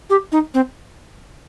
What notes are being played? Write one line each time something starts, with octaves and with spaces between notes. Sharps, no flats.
G4
D#4
C4